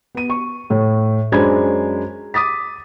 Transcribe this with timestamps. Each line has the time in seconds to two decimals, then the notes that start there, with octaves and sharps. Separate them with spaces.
0.15 B3 D#7
0.30 C#6
0.70 A2
1.32 F#2 G#3 D4 C5 B5 G#6
2.34 D6 D#6 A6 B6